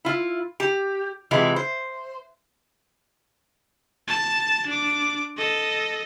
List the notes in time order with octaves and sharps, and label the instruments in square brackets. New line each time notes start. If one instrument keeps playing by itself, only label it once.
[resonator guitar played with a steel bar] E4 F4
G4
C3 E3 G#3 E4 F4
C5
[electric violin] A5
D4 D6
A4 D#5